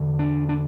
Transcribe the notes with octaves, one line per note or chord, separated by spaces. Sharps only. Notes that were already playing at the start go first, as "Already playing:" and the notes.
Already playing: E2 D3
D4
D4